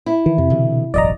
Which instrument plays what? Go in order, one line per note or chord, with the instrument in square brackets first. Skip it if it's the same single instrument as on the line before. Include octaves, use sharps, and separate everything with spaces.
[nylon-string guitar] E4
[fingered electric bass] D#3 [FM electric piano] E3
[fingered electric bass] F2 [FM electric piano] C3
[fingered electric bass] B2 D3 E3
[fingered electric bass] E1 A1 F#2 [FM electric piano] D5 D#5 A#5